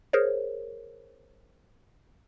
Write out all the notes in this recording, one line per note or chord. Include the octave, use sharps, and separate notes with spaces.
G#4 A#4 C5 C#5